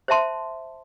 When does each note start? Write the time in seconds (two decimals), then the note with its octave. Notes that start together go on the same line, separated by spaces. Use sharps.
0.08 C5 E5 A5 C6